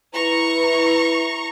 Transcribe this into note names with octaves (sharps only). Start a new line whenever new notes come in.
E4 B4 A#5 C#6